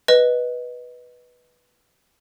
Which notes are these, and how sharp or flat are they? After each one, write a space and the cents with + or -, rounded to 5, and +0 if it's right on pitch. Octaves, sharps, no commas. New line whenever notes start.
B4 -10 D#5 +0